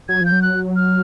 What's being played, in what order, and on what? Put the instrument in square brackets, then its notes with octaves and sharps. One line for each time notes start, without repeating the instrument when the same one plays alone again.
[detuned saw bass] F#3 [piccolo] G#6
[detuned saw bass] F3 [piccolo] G6
[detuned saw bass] F#3
[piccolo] F#6
F6